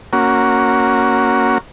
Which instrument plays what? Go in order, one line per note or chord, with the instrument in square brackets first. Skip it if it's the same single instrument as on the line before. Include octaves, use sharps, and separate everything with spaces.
[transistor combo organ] A#3 C#4 F#4